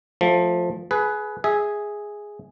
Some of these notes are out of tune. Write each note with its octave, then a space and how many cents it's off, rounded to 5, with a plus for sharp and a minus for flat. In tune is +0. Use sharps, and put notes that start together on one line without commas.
F3 +15 A3 +0
G#4 +25 B4 +0
G#4 +0 E5 -20